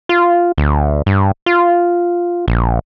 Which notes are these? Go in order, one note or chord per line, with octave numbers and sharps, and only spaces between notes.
F4
D2
G2
F4
A#1